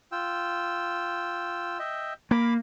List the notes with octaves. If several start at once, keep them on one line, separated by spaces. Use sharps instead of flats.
F4 G5 E6
D#5 E5 G5
A#3 B5 D6